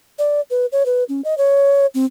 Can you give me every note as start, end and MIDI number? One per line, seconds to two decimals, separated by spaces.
0.19 0.40 74
0.50 0.66 71
0.72 0.85 73
0.86 1.04 71
1.09 1.21 61
1.24 1.37 75
1.38 1.86 73
1.94 2.05 60